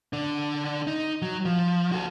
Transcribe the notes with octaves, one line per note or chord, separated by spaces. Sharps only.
D3 D4
D#4
F#3
F3
F#4 A4